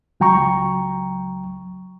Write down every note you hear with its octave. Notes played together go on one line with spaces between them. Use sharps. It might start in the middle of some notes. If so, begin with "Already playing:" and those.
C#2 F#3 G5 A#5 C#6